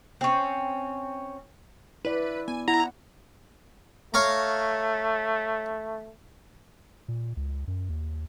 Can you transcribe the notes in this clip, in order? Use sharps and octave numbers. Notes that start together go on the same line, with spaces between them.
C4 C#4
E4 B4 D5
B3 G#5
E4 F#5 A#5
A3 C#5 F5 A#5
A#2
C#2
F#2
D#2